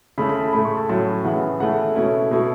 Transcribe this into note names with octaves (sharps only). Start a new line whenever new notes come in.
C#3 A3 E4 B5
B5
A5
A2 A3 E4 B5
C#6
A5
A2 F#3 C#4 E4 A5
C#3 E3 B3 F#5
C#3 A3 E4 F#5
B2 A3 C#4 E4
B2 A3 E4